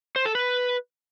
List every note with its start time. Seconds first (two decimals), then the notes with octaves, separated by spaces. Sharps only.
0.16 C5
0.25 A4
0.35 B4